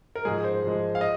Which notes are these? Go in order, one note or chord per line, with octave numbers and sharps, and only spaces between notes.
A#4
G#2 F3 G#3 G#4
C5
G#2 F3 G#3
F5
D#5